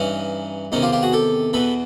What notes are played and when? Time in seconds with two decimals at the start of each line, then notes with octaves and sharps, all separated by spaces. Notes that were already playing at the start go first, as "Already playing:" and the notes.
Already playing: G2 E3 C#4 D#4
0.72 E2 C3 D#3 C#4 D#4
0.82 F4 G4
0.93 F4 G4
1.02 F#4 G#4
1.13 G4 A4
1.53 E2 B2 A4 B4